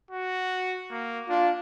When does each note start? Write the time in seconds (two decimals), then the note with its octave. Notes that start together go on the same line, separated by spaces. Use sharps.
0.11 F#4
0.91 A#3
1.29 D4 F4